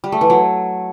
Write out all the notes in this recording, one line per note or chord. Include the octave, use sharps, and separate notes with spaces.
G3
A3
E3
F#3